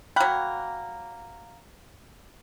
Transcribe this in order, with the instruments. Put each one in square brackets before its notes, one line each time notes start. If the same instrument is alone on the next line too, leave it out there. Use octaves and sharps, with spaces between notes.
[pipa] F#3 A#3 [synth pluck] G5 B5 F#6